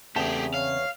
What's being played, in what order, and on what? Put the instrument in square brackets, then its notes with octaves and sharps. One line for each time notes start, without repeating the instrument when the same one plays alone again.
[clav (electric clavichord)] E2 [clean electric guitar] C#3 C4 A5 [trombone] A3 [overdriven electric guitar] G4 G#4
[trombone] C#5 [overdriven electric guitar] F5